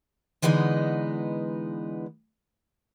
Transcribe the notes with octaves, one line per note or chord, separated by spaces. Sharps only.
D3 E3 G#3 B3 D#4